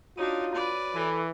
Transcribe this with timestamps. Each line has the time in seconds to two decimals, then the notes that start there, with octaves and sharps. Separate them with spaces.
0.17 D4 D#4 F4 F#4 C#5 D#7
0.54 B4 D5
0.95 E3 A4